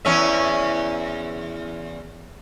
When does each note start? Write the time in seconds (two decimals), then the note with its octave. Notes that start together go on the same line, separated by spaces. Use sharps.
0.05 E2 C#4 E5